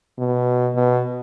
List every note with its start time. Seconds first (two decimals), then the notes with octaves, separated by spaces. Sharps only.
0.18 B2
0.75 B2